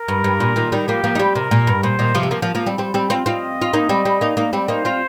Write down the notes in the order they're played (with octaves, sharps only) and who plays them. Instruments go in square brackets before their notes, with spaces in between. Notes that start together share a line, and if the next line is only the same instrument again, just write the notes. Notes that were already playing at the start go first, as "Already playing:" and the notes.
Already playing: [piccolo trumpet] A#4
[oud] G2
G2
A#2
A#2 D#3
D#3 G3
[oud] F3 A#3 [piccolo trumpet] G4
[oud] F3 A#3
D#4
G3 C4
[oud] C3 [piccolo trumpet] A#4
[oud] A#2
G2
[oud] A#2 [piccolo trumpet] C5
[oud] A#2 D#3
C3 F3
C4
F3 A#3
F3 A#3
F3 A#3
G3 C4
G3 C4
G3 C4
C4 F4
[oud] C4 F4 [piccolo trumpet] D#5
[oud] F4
A#3 D#4
G3 C4
G3 C4
A#3 D#4
A#3 D#4
G3 C4
[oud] A#3 D#4 [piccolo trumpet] C5
[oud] C4 F4